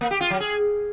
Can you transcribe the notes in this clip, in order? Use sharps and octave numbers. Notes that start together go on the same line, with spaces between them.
A#3
G4
F4
F#3
G#4